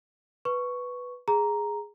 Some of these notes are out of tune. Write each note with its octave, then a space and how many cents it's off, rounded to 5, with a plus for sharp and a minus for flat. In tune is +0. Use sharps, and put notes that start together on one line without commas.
B4 +0 C#6 +0
G#4 +0 A#5 +0